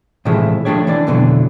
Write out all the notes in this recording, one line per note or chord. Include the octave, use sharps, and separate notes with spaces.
A2 C3 E3 F3 G#3 A3
F3 G3 A3 D4 G4 C#5
E3 D4 D5
F2 B2 D3 E3 F#3